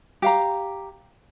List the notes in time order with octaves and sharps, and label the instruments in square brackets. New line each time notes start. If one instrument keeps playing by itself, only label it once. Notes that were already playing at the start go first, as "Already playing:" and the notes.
[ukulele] G4 F5 A#5